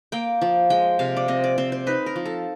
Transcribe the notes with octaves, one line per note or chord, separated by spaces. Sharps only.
A#3 G5
F3
G#3 G5
C3 F5
D5
C4 D#5
D5
C4 C5
C5
D#4 B4
A#4
F3
A4